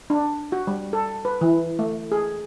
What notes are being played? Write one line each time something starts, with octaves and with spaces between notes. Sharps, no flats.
D4
F#4
G3
A4
B4
E3
A3
G#4